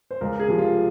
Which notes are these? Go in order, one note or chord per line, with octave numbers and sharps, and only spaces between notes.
C5
C#2 A#4
G#4
C3 F3
F4